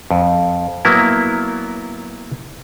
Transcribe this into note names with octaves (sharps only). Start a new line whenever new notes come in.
F2
F#3 A#3 B3 E4